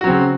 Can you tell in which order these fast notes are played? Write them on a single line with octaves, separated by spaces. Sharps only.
F#4 F#3 C4 C#3